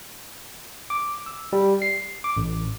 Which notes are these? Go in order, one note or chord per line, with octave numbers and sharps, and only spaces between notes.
D6
E6
G3
C7
D6
A1